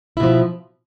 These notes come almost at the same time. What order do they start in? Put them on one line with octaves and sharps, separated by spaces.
E4 B2 F3